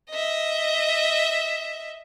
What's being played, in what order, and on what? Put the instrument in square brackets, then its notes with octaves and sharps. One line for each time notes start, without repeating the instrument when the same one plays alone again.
[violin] D#5 E5